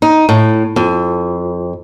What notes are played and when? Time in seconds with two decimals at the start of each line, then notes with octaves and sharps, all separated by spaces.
0.02 D#4
0.29 A2
0.76 F2